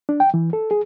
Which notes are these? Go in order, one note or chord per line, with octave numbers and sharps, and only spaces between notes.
D4
G5
E3
A4
G#4